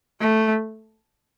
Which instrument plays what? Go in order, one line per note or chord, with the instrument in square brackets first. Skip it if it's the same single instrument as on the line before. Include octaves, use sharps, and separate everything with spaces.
[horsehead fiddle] A3